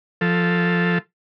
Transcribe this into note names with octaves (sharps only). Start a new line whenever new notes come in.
F3 A4